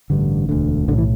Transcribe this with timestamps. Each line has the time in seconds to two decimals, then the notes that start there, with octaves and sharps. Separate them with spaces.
0.10 A1 G2 D3
0.49 E1 D2 D3
0.88 B1 A2 D3
0.98 E3